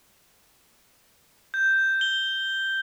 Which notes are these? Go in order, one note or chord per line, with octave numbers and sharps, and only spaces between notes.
G6
G7